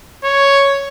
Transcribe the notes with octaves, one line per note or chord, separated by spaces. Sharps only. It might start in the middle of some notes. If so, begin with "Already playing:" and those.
C#5